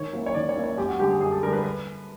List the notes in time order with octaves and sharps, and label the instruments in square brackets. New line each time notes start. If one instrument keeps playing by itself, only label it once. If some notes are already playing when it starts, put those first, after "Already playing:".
Already playing: [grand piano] D#3 C#5
F#3 A#3 C#4 E4
C#5
D#3 D5
C#5
F#3 A#3 C#4 E4
C#5
F#2 G4
F#4
D3 G3 G4
G#4
F#2 G#4
A4
D3 G3 A#4
B4
B4